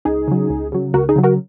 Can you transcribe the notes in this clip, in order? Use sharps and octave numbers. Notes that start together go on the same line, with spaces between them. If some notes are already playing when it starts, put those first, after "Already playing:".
C#2 D#4 G#4
C#3 F#3
C#2
C#3 F#3
C#2 F#4 A#4
D#4 G#4
C#3 F#3
F#4 A#4